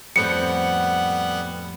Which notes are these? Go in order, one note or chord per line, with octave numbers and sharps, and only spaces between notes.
F2 A2 G3 B3 F#5 G5 C#7